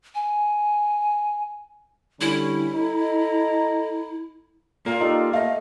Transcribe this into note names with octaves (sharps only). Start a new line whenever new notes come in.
G#5
D3 G3 C#4 E4
A4 D#5 A#5
A#2 A#3 F4 A#4
D#4 G4 A4 D5
A3 D#5 F5